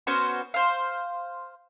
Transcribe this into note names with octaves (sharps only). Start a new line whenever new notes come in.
B3 C#4 F#4 C5
C5 F5